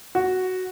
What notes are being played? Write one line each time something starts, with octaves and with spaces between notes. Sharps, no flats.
F#4